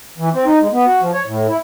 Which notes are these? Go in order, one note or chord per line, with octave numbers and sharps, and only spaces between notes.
E3
C4
D#4
G#3
B3
F#4
F3
C#5
A2
E4